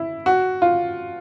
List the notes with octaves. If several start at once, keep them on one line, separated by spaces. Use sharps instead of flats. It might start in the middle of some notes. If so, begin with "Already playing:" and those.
Already playing: E4
F#4
F4